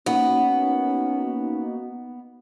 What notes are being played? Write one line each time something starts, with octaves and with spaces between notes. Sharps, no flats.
A#3 B3 C#4 D#4 F#4